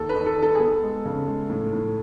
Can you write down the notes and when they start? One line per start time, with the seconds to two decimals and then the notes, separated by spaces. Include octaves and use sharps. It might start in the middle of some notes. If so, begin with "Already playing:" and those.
Already playing: D#2 A4
0.09 B4
0.15 D#2
0.26 A4
0.38 D#2 A4
0.55 G#4
0.60 B3 A4
0.83 G#3
1.05 C#3
1.27 G#3
1.50 A2
1.73 A2